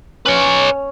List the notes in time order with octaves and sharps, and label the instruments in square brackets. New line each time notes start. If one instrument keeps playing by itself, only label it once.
[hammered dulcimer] C#4 [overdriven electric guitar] B4 C#5